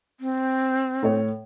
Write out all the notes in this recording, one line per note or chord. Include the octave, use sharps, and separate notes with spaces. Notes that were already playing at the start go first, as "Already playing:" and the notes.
C4
A2 C#5